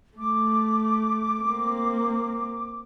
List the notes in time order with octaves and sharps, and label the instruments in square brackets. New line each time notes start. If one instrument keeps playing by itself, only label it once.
[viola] A3 [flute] D6
[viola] A#3 C4